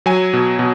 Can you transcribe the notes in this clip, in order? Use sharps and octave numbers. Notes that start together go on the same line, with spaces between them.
F#3 G#5
B2
B2